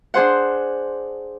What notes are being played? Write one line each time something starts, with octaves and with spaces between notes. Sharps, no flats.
D4 G#4 C5 F#5